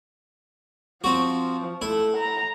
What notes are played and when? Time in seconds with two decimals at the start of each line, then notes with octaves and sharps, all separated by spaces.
1.04 F3 C4 F#4
1.82 A3 E4
2.17 A#5